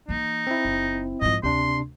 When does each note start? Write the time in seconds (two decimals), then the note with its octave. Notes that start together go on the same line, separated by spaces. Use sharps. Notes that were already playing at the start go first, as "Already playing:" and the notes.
0.09 E3 A#3 D#4
0.47 C4 E4
0.65 F#1
1.21 G#2 F3 D#5
1.43 D2 C3 D4 C6